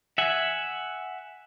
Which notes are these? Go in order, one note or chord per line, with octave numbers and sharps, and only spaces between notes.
E5 F#5 G#5